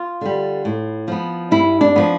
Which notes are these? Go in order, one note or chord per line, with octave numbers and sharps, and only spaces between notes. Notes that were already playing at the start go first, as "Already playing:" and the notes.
Already playing: F4
D3 G3
A2
F3 B3
G2 E4
D4
F3 B3